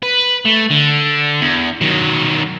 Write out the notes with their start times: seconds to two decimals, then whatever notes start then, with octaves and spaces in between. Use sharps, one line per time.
0.03 B4
0.45 A3
0.70 D3
1.41 E2
1.81 D#3 F#3